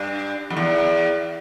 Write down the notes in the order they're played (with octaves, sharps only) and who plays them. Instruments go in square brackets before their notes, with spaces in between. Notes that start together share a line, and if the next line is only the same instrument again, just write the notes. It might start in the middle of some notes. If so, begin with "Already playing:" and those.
Already playing: [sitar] G2
F2
E2